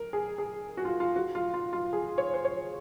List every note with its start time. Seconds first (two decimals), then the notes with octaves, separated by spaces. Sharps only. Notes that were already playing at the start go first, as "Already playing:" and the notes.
Already playing: A#4
0.13 G#4
0.38 G#4
0.77 F#4
0.85 F4
1.00 F4
1.16 F#4
1.35 F4
1.54 F4
1.73 F4
1.93 G#4
2.18 C#5
2.34 C5
2.45 C#5